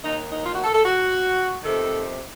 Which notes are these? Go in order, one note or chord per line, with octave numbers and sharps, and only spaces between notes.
D#2 D#3 D#4
D#4
F4
F#4
A4
A4
F#4
F2 C3 D#3 A4